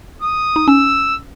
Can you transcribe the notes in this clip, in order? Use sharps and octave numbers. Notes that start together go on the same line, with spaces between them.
D#6
D#4
C#4 E6